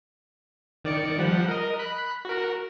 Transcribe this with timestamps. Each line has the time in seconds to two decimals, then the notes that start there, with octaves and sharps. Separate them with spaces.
0.85 D#3 D5 C#7
1.19 F3 G3 F#5
1.48 A#4 D#5
1.79 B5 F#6
2.25 F#4 A#4